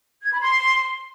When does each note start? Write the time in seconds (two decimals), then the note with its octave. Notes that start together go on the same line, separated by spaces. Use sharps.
0.23 G#6
0.32 B5
0.40 C6